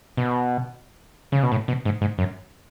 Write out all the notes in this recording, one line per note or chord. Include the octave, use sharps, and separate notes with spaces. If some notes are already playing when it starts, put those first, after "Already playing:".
B2
C#3
B2
A2
B2
G#2
G#2
F#2